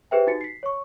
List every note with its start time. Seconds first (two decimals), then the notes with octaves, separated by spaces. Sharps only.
0.11 G4 G#4 B4 C5 E5 G5
0.27 D#4 F#4 A6 C#7
0.41 B6 C7
0.63 C#5 C#6